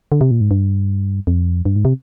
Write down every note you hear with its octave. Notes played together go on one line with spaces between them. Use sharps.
D3
C3
A#2
G#2
G2
F2
G2
G#2
C3